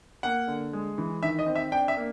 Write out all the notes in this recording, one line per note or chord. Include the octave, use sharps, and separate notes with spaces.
A#3 F#5
D3
G#3
E3
D#3 E5
D#5
C4
E5
D4 G5
E5
A#3